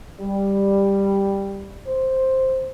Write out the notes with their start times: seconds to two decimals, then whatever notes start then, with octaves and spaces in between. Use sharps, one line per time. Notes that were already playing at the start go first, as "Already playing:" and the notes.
0.20 G3
1.87 C5